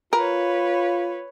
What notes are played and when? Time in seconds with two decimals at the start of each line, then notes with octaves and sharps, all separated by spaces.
0.13 F4 A#4 B4 C#5